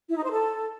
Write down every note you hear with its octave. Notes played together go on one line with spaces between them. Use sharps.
E4
D#4
C5
A4